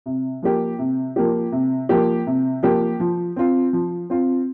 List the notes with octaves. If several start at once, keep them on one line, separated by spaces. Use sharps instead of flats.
C3
F3 A#3 G4
C3
F3 A#3 G4
C3
F3 A#3 G4
C3
F3 A#3 G4
F3
C4 F4
F3
C4 F4